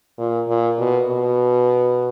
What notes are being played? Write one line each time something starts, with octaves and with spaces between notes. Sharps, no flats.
A#2
A#2
B2
B2